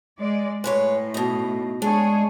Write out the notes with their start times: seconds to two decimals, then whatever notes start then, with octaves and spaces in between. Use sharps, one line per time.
0.18 G#3 D5
0.64 A2 G#3 B4 C#5
1.14 B2 D#4
1.82 G#3 D4 G#4 C#5